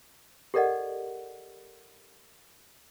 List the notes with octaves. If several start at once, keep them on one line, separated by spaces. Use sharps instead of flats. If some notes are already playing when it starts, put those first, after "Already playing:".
G4 A4 A#4 D5 D#5 F#5